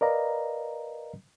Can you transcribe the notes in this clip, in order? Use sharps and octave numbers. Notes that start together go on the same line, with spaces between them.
A#4 B4 D5 D#5 F5 A#5